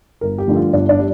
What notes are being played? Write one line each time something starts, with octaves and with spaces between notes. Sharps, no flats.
G1 A#4
G4
G2 D3 F3 A3
F4
G1 D4
D4
G3